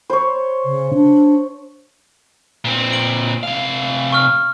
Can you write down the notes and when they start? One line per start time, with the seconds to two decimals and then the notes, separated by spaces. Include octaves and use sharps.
0.10 C5 C#5
0.65 C#3
0.94 D4
2.65 A#2 C4
2.93 D7 F#7
3.43 C3 F5
4.12 C#6 F6